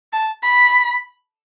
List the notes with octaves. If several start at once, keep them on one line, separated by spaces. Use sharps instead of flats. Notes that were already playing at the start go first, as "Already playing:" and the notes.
A5
B5